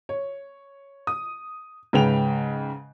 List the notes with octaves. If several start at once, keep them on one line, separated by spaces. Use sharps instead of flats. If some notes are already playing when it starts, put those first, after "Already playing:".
C#5
D#6
G#2 C#3 B4 G5 F7